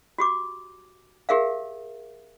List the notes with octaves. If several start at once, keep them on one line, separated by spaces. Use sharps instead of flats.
F#4 G4 D6
G4 G#4 A#4 E5 F5